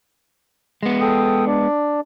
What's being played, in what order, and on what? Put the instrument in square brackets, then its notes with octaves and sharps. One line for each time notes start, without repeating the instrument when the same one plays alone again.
[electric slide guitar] G#3 B3
[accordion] A4 G5 D#6
D4 D5